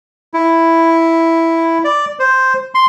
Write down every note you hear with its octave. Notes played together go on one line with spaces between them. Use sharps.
E4
D5
C5
C6